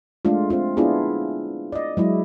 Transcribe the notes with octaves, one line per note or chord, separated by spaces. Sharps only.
G#3 A3 D4 F4
C4 F4
B3 D4 E4 F4 G#4
D5 D#5
F#3 G#3 E4